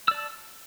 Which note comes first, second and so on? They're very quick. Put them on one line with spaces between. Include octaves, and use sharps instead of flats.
E6 D5 A5